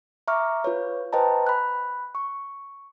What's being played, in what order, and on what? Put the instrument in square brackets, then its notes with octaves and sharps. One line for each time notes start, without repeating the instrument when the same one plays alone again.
[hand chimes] E5 A#5 C#6 D6 F6
F4 B4 C#5
B4 C5 D#5 G5 A5 A#5
B5 F#6
C#6